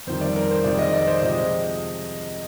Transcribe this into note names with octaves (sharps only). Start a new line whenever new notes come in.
F2 D#3 G3 C5
D5
A#4
C5
F2 C3 D#3 G#3 D5
D#5
D5
C5
C3 F3 G#3 D#5